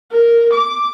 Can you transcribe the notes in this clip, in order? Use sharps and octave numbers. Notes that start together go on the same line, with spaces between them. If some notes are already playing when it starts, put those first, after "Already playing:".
A#4
D6